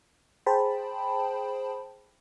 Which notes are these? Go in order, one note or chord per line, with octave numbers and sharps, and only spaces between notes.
G#4 C5 G5 A5 B5